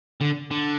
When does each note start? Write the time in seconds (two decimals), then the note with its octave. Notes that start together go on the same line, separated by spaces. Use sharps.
0.21 D3
0.51 D3